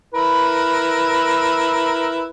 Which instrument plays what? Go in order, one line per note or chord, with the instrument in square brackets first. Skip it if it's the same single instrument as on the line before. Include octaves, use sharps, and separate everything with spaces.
[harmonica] E4 A#4 B4